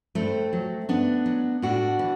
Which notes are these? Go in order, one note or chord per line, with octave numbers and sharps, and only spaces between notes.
G2 A3 C4
F#3
G2 B3 D4
F#3
A2 D4 F#4
E3